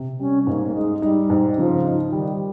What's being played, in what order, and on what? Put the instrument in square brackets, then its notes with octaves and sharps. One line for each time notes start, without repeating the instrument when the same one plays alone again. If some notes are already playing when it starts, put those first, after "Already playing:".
Already playing: [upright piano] C3
[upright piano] G3 [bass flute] C#4
[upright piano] G#2 [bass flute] A#3
[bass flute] A#3
[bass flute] G#3 [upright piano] D#4
[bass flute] G#3
[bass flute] G3 [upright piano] D#4
[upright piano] G#2
[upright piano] C#3 [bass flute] F3
[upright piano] D#4
[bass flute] D#3 [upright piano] G3